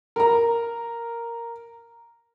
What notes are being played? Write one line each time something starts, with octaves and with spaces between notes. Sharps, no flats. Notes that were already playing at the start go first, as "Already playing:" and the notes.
A#4 A#5